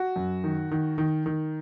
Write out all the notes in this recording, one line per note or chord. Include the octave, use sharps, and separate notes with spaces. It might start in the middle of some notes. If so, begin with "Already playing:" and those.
Already playing: F#4
F#2
D#3
D#3
D#3
D#3